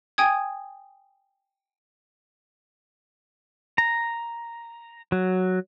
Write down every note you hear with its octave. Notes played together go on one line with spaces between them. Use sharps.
G5 G#5 D#6 G#6
A#5
F#3